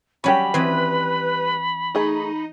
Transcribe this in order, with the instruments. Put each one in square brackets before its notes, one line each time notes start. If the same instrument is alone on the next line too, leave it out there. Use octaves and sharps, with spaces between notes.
[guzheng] F#3 C#4 [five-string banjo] G3 G4 [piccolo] B5
[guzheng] E3 C4 D#5 [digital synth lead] B4
[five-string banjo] A3 G#4 [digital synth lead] D#4